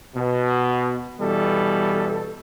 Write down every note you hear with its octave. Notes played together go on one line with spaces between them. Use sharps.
B2
B2 E3 G3 A4